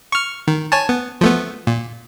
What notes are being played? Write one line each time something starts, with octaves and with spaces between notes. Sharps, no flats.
C#6 F6
D#3
C#5 G#5 A5
B3
F3 A3 B3
A#2